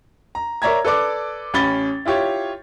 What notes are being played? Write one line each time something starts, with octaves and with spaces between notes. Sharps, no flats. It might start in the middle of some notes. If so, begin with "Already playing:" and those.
A#5
A#4 C#5 D5 E5 A#5 G#6
A4 B4 D5 D6
A1 C#4 B5 A6 G7
E4 F4 G4 C#5